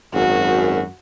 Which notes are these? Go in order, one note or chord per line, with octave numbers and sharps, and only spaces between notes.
G#1 F#2 F#4